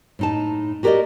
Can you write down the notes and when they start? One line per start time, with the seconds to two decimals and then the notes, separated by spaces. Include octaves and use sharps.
0.19 A2 D#4 A5
0.83 F#4 G4 A#4 B4 D5 D#5